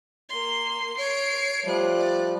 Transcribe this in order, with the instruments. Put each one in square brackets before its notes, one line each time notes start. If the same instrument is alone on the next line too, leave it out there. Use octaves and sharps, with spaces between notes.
[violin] A#3 C6
[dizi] C#5 [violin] C7 D7
[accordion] F3 G3 [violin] A3 F#6
[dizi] D5